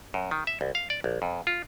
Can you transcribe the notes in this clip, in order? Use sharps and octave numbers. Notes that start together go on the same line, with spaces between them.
F#2
D#3
E5
C2
F5
D5
A#1
F2
F4